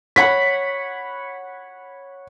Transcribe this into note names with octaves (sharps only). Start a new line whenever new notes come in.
C#5 F#5 B5 B6